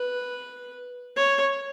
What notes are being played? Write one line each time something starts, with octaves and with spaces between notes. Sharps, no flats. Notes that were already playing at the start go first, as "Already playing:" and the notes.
Already playing: B4
C#5